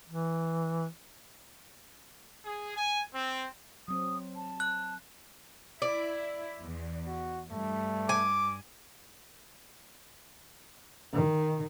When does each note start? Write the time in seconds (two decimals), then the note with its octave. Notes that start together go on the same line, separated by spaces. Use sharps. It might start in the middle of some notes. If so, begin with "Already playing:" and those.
0.07 E3
2.45 G#4
2.76 G#5
3.14 C4
3.88 F#3 C4 D#6
4.36 A5
4.60 F#6
5.82 E4 D5
6.61 E2
7.07 F#4
7.51 G2 A3
8.09 G#5 D6
11.13 D#3